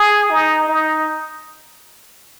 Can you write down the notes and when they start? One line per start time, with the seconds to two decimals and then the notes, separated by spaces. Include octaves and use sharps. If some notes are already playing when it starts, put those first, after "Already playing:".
Already playing: G#4
0.30 D#4
0.68 D#4